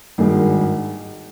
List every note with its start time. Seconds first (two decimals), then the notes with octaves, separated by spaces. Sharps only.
0.18 G#1 G2 D#3 G#3